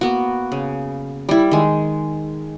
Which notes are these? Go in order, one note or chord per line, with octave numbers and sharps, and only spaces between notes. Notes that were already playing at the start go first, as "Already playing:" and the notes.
A#3 B3 F#4
C#3
G3 E4
D#3 G#3